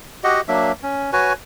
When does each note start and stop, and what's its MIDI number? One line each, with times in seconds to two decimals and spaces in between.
0.24 0.41 66
0.24 0.41 67
0.24 0.41 75
0.24 0.41 78
0.48 0.72 54
0.48 0.72 58
0.48 0.72 62
0.48 0.72 76
0.83 1.11 61
1.13 1.33 66
1.13 1.33 71
1.13 1.33 73
1.13 1.33 80